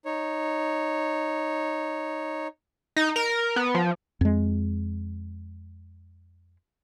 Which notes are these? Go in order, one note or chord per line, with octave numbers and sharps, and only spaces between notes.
D#4 C#5
D#4
A#4
B3
F3
F2 G#3